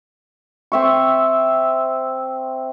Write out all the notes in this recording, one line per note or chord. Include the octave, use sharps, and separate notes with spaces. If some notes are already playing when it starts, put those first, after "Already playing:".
C4 E5 C#6